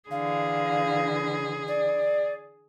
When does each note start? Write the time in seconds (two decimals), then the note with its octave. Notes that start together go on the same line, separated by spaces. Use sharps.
0.10 D3 E3 G#4 F5
1.67 D5